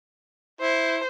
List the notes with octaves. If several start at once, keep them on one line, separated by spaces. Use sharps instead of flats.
E4 C5